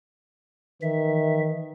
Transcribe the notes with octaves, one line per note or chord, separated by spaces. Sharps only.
D#3 E3 E5